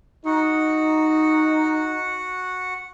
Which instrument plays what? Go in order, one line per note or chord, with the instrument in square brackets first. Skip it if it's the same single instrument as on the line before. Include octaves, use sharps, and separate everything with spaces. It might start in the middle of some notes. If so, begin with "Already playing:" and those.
[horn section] D#4 [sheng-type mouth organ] F#4 F#5